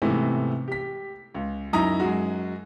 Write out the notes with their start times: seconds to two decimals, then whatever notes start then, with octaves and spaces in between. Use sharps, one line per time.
0.02 G#2 C3 E3 A3 B3 C4
0.68 G4 B6
1.34 C#2
1.73 F#2 D#4 E4 A#5 D#6
2.00 F#2 G#3 F#4